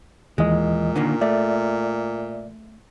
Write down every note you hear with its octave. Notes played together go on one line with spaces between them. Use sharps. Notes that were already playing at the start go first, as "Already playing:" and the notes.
D#2 A#2 E3 G#3 D#5
D3 D#3 A#3
A3 D5 E5